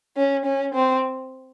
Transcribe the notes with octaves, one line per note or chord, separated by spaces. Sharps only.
C#4
C#4
C4